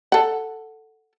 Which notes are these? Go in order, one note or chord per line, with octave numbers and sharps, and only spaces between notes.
A4 F#5